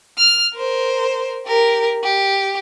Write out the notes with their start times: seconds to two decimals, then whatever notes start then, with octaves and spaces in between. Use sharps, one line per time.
0.18 F6
0.55 A#4 C5
1.46 G4 A#4
2.04 G4